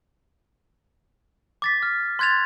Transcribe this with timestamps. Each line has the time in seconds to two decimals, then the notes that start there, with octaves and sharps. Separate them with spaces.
1.62 D6 A6 B6
1.83 F6
2.19 C6 F#6 G#6 A6 F7